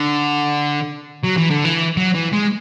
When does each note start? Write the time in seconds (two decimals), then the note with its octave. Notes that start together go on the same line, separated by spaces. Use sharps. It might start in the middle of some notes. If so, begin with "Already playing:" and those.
Already playing: D3
1.23 F#3
1.37 E3
1.50 D3
1.65 E3
1.97 F#3
2.14 E3
2.33 G#3